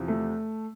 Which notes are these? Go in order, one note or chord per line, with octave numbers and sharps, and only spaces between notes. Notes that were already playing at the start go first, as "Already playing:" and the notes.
Already playing: E2 C3 F3
A3